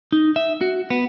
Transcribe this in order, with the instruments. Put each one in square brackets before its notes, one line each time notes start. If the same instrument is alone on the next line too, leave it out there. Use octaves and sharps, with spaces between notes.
[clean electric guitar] D#4
E5
F#4
B3